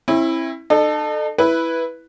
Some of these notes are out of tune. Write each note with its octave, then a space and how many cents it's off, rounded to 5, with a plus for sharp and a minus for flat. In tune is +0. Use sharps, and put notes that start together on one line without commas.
C4 +45 E4 +0
D#4 -45 A4 +0
E4 +0 B4 +0